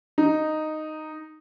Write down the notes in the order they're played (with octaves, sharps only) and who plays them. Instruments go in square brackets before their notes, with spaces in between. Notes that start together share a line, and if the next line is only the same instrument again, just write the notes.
[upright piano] D#4